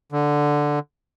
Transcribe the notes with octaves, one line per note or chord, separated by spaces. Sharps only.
D3